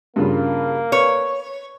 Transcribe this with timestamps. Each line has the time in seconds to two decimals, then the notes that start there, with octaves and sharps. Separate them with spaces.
0.16 G2 C#3 A#3 F4
0.92 B4 C#5